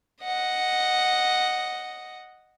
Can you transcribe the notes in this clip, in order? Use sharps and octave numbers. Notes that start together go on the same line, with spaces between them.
D#5 F#5